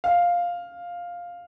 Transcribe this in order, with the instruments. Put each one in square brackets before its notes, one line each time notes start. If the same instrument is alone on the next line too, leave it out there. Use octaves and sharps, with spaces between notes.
[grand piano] F5